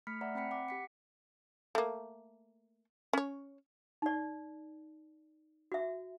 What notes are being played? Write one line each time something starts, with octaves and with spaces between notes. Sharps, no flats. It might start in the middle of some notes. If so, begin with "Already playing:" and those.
A3 B5 F6 B6 C#7
D5 E5 F#5 A#5
C4 F#5 G5 B5 B6 C#7
F#5 D6
G4 B6 C#7
A3 A#3
C#4 C#5
D#4 D5
F#4 E5